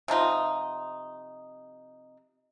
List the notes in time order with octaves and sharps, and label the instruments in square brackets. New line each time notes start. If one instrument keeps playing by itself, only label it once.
[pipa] C3 F3 D#4 F4